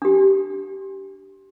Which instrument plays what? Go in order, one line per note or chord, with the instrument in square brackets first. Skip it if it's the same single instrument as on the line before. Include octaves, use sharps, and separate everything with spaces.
[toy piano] D4 G4